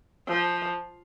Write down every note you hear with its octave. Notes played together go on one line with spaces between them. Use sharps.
F3